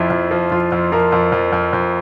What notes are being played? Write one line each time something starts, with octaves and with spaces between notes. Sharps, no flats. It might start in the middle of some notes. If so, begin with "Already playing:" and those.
Already playing: F2 F3 E4
F2
F3
F2 F4
F2
F3 A#4
F2
F2
F2
F2